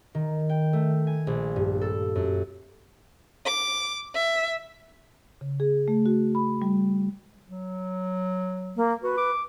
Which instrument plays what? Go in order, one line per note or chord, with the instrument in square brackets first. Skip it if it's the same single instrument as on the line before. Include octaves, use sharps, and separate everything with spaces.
[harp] D#3
G5
A3
G#5
A#1
G2
A4
F#2
[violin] D6
E5
[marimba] C#3
G#4
A3
F#4
B5
G3
[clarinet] F#3
[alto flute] A#3
[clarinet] F#4 [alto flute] B4
[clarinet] D6